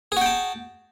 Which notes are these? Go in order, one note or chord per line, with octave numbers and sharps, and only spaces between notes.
F#4 G#4 G5 A5